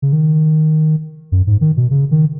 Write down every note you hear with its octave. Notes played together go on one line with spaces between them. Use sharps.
C#3
D#3
F#2
G#2
D#3
B2
C#3
D#3